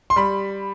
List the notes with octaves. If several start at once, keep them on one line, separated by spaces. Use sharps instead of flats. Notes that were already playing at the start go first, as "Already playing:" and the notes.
C6
G3 B5